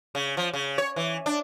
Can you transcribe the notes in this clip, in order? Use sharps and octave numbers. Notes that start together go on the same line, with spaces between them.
C#3
F3
C#3
C#5
E3
D4